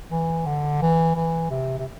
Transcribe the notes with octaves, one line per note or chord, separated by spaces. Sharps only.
E3
D3
E3
E3
C3
C3